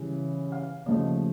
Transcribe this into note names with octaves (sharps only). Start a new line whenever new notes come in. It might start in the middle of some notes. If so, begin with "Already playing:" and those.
Already playing: C#3 E3 G3
F5
D#2 C#3 F3 A3 D#5